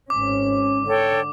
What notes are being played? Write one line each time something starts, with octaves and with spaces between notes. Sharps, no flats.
G#1 C#4 D6
D3 A4 C#5 G5